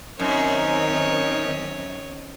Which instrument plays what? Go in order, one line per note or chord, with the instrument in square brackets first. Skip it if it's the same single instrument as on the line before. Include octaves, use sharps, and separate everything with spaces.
[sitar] F#2 [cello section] D#3 C4 D#5 [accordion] D#4 A#4 [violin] C#5